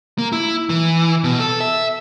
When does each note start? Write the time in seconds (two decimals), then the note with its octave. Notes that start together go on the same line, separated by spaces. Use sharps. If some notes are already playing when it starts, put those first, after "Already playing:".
0.18 A#3
0.32 E4
0.69 E3
1.24 B2
1.40 A4
1.60 E5